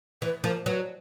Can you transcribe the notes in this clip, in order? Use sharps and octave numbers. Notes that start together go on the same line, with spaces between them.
E3 B4
F3 A#4
F#3 B4